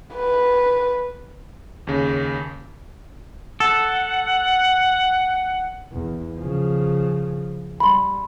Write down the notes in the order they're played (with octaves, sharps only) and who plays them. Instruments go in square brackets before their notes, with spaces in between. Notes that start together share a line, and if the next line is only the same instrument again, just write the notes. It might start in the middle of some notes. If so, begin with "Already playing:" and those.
[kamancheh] B4
[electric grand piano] D#2 C#3
[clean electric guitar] A4 [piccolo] F#5
[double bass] E2
C#3 F3
[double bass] G3 [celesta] B5 C6